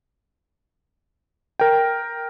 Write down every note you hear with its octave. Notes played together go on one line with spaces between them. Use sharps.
A#4 G5